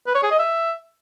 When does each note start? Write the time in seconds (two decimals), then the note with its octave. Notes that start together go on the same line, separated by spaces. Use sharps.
0.07 B4
0.15 C#5
0.23 G#4
0.31 D#5
0.39 E5